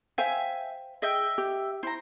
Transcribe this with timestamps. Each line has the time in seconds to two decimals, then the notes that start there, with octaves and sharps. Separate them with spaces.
0.18 C5 E5 F5 G5 G#5 E6
1.02 G#4 D#5 E5 G5
1.38 G4
1.83 E4 C5 A#5